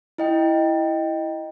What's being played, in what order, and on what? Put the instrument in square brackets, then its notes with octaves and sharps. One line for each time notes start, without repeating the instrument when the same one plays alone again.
[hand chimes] E4 D#5 G5